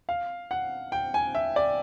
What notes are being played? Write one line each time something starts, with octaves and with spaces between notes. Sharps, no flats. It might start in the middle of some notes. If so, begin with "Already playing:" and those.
F5
F#5
G5
G#5
E5
D5